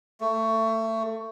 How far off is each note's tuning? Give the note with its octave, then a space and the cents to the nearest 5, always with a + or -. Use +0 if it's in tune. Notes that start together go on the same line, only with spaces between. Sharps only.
A3 +25